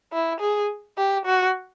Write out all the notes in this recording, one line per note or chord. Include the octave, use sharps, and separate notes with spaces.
E4
G#4
G4
F#4